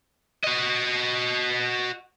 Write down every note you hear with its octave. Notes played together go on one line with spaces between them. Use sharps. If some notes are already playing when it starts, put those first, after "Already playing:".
F#4 D#5